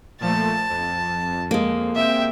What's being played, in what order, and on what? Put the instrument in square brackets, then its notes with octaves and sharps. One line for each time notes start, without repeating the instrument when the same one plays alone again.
[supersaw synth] A#2 F3 A3 [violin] A5
[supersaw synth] F2
[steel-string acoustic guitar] G#3 A#3
[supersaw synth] C3 G5 [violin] E5